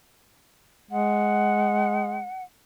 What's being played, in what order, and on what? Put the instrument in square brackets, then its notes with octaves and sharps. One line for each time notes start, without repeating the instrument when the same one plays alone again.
[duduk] G#3 [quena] F#5